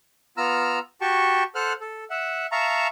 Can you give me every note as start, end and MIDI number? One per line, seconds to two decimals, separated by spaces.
0.37 0.79 59
0.37 0.79 65
0.37 0.79 82
0.37 0.79 88
0.37 0.79 89
1.01 1.43 66
1.01 1.43 67
1.01 1.43 79
1.01 1.43 81
1.01 1.43 85
1.55 1.73 69
1.55 1.73 72
1.55 1.73 78
1.55 1.73 89
1.55 1.73 90
1.81 2.04 69
2.10 2.46 76
2.10 2.46 78
2.52 2.87 76
2.52 2.87 77
2.52 2.87 81
2.52 2.87 82
2.52 2.87 85